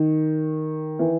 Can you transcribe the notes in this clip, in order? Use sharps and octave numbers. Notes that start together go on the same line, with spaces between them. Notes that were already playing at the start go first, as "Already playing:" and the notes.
Already playing: D#3
E3